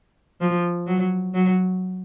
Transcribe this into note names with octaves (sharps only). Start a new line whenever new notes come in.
F3
F#3
F#3